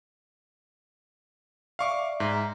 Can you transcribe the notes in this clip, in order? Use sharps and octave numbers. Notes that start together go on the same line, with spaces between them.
D5 E5 F5 C#6 D6
G#2 A#5